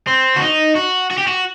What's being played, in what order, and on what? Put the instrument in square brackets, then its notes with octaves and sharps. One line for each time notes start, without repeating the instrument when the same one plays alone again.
[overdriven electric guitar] C4
F#4
D#4
F#4
F#4
G4
F#4